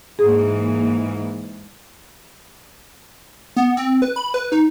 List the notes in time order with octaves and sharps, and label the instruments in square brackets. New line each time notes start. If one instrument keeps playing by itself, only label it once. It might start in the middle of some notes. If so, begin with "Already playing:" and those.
[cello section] G#2 E3 A#3 [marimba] G#4
[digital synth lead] B3
C4
B4
B5
B4
D#4